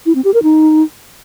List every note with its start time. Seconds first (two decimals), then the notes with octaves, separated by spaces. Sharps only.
0.06 E4
0.15 C4
0.25 G4
0.34 A#4
0.43 D#4